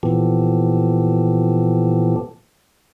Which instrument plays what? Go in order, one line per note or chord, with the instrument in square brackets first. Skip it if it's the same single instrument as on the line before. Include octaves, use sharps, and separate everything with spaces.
[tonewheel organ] A#2 E3 F3 B3 G4 A4